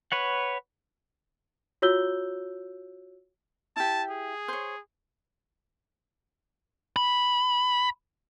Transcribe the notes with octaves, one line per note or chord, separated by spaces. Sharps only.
B4 C#5 F#5
F4 F#4 C#5 E6 G6 G7
E4 G4 A5
G#4
C5 C#5
B5